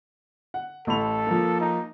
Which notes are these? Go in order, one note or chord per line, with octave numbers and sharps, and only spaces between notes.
F#5
A1 A4 B5 F7
F3 A#3
D#4